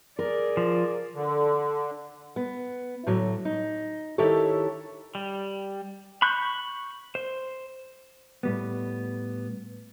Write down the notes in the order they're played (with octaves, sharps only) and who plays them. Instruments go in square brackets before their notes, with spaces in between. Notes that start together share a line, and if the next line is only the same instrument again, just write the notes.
[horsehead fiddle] G#4 D5 [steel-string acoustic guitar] A#4
[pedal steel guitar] F3
[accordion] D3
[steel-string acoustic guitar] B3
A2 D3 F#3
D#4
D#3 D4 E4 G4 A4 C#5
[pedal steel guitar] G3
B5 C#6 F#6 G6
C5
[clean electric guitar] A2 G3 B3